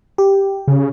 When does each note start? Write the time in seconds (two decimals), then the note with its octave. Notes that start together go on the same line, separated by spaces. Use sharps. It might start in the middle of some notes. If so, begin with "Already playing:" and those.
0.18 G4
0.67 C#3